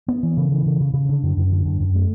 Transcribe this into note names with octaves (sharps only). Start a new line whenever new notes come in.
B3
E3
C#3
E3
C#3
C#3
C#3
D3
F#2
F#2
D3
F#2
F#2
A3